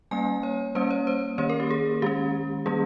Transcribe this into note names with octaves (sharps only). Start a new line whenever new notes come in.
G3 A#3 C#4 G#5
C#5
G3 A#3 C#4 C5
C#5
C5
D#3 A#3 C#4 C#5
A#4
G4
G#4
D#3 G#3 C#4 G4
D#3 G3 A#3 C#4 G#4